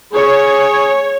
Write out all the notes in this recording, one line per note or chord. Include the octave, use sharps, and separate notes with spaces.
G#4 C#5